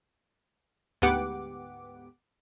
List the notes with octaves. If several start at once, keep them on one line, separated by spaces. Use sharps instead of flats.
D2 G#2 B3 G4 F#5 D6